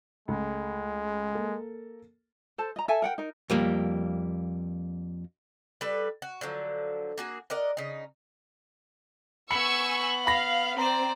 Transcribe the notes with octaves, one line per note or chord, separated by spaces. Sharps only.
C#2 G#3 A3
A#3 A4 A#4
A4 C5 A5
D#5 A#5
A4 E5 G#5
A#4 F#5 G5
D#4 A#4
F2 G3 A#3
G3 A4 B4
F#4
D3 F3 F#3
A#3 F#4 G#4
A#4 D5 D#5 F#5
C#3 D#4
B3 G#5 B5 C#6 E6 C#7 F#7
F5 B5 A#6
C4 C5 D5 A#5